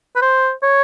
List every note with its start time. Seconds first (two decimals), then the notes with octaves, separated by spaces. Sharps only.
0.16 B4
0.22 C5
0.63 C#5